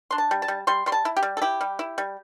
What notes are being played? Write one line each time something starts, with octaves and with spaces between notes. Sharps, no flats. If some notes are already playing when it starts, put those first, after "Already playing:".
D4 C6
A5
G3
A5
G3
G3 C6
G3 C6
A5
E4
G4
G3
A4
E4 G4
G3
E4
G3